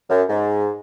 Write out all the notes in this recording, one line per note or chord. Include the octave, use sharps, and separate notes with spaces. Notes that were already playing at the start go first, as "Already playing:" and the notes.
F#2
G#2